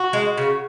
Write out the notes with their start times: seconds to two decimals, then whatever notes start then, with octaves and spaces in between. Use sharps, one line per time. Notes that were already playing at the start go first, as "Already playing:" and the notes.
Already playing: F#4
0.13 G#3
0.38 C#3